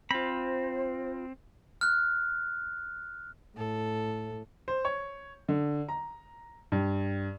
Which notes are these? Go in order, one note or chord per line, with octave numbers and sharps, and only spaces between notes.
C4 F4 C5 B5
F6 F#6
A2 A4
C5
C#5
D3
A#5
G2